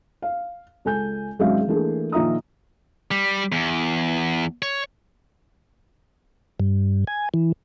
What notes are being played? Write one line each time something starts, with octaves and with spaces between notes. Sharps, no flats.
F5
C#2 A4 G#5 G6
G#1 F#3 G#3 C#4 E5 F5
E3 A3 A#3 D4 G#4
A#1 D#3 F4 E5 A#5 D#6
G3
E2
C#5
G2
G#5
E3